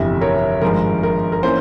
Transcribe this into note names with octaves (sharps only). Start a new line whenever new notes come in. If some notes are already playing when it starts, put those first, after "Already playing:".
Already playing: G1 F2 C3 E3 G3 E5
A#4 C#5
G#1 G2 F3 G#3 A#4
A#4
A#4
E3 A#3 C#4 C5